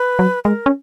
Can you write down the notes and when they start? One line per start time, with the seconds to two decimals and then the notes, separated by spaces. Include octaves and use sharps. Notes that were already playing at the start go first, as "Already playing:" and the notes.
Already playing: B4
0.19 F#3
0.45 G#3 A#4
0.66 C#4